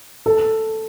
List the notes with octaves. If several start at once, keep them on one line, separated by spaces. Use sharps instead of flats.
A4